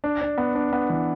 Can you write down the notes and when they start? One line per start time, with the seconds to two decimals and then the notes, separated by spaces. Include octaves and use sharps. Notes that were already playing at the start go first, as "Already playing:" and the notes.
0.04 D4
0.21 D4
0.38 B3
0.55 D4
0.73 B3
0.90 E3